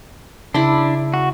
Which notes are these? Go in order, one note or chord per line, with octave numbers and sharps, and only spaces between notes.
C#3 D4 E4 B5 C6
F#4